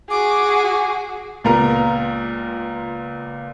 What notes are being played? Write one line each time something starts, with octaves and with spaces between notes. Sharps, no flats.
F#4 G#4 D6
C#2 A#2 B3 F4 A#4 A#5